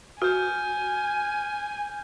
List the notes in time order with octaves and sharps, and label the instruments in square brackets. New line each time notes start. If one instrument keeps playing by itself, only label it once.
[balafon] F#4 [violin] G#5 [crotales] F6 G6